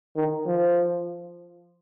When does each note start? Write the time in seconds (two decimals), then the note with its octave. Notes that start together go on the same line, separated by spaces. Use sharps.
0.16 D#3
0.46 F3